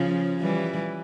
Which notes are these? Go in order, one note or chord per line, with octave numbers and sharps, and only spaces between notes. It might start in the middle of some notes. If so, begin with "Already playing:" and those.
Already playing: C#3 F3
E3 G3